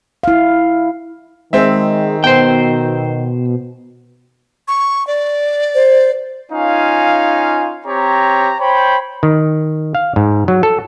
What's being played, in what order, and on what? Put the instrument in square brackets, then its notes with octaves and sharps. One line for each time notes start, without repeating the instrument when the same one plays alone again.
[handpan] E4 F5
[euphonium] D#3 [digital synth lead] G#3 [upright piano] C4 E5
[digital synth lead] B2 [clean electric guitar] C5 G5
[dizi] C#6
D5
[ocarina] C5
[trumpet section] C#4 D#4 F4 F5 G#5
C4 G4 C#5 A#5
C5 C#5 G5 B5
[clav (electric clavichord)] D#3
F5
G#2
F#3
A4